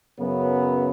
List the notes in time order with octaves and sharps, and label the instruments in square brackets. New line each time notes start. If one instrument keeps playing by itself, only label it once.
[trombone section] F#2 C#3 F#3 B3